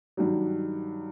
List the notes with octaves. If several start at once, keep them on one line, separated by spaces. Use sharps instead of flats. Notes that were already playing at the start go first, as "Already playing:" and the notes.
G2 D#3 F#3